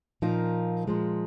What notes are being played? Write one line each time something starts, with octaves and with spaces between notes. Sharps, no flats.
A#2 F3 A#3 D#4
A#2 F3 G#3